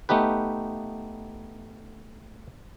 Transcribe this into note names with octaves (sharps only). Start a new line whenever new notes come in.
A3 B3 D#4 G4 B4